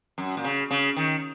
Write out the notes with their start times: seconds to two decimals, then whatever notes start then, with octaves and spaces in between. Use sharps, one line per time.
0.18 F#2
0.37 A#2
0.44 C#3
0.71 C#3
0.96 D#3